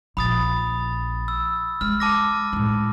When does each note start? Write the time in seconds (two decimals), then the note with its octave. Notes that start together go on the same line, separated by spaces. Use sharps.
0.17 A#1 B5 D#6 A6
1.28 E6
1.81 G#3 F6
2.00 A5 D6 A#6
2.53 A2 G#3